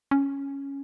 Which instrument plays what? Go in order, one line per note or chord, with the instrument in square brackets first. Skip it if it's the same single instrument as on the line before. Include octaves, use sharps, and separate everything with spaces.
[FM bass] C#4